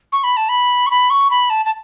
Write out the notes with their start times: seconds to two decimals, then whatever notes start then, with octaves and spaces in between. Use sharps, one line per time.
0.12 C#6
0.23 B5
0.37 A5
0.49 B5
0.86 C#6
0.90 B5
1.10 C#6
1.30 B5
1.50 A5
1.65 A5